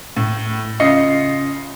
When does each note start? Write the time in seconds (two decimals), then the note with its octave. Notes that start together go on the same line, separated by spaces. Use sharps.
0.17 A2
0.80 C#3 F4 D#5 C7 C#7